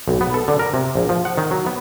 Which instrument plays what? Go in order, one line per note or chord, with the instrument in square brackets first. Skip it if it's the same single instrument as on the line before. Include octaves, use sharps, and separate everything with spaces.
[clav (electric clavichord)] B1
B3
A4
D3
A#4
C3
A#1
F3
F#5
D#3
F#3
B3